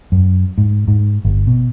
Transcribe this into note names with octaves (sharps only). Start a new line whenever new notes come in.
F#2
G#2
G#2
G1
B2